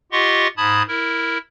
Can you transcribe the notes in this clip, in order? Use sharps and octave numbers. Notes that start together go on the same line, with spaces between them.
F4 G4 D#5 F#5 C6 C#6
G#2 A5 B5 D#6 G#6
E4 A#4